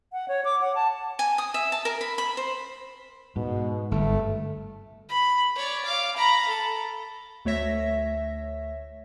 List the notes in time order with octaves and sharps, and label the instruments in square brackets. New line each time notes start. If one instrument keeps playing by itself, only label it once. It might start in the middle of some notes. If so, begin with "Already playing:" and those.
[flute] F#5
C#5
D6
F#5
A5
[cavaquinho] G#5
D#6
E5
A5
A#4
B5
B5
C5
[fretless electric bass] G#2 [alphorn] B2
[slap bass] G1 [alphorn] A3
[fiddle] B5
C#5 D5
F5 D6
A#5 B5
A4
[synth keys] D2 A3 C#5 E5 A#6